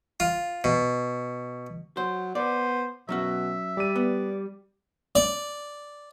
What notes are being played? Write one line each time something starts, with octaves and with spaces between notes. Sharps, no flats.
F4
B2
F#3 C5
B3 C5 D5
B2 F#3 C#4 F#4 E5
G3 D5 D#7
B3
D5